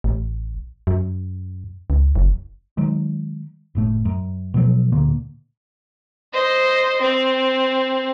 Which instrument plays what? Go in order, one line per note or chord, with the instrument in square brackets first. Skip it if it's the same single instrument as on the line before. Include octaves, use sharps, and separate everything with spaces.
[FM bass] A1
F#2
C#2
F#1
[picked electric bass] D#3 F#3 G#3
F#1 A2 A3
F#2
B2 F3 F#3
D1 A#2 D3 A#3
[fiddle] C5 D#5
C4